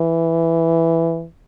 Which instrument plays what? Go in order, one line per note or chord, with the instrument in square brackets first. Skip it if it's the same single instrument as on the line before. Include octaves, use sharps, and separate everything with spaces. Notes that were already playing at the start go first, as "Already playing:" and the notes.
Already playing: [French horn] E3